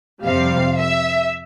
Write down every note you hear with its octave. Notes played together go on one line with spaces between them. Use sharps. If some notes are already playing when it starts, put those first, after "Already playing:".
F2 C3 G3 F5
E5